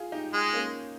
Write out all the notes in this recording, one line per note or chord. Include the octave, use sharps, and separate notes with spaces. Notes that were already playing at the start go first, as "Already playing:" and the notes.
Already playing: F4 G#4
D#4 G4
G#3
A#3 C#4